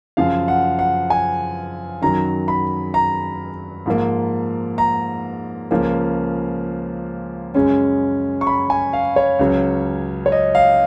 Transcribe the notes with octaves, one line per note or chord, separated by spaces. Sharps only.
F#2 C#3 F3 F5
F#5
F#5
G#5
F#2 D#3 F#3 A#5
B5
A#5
G#2 F3 A#3
A#5
C#2 C#3 F3 A#3 C#4
F#2 C#3 G#3 C#4
C#6
B5
G#5
F5
C#5
C#2 C#3 F#3 C#4
C#5
D#5
F5